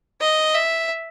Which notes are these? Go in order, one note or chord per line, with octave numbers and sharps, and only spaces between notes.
D#5
E5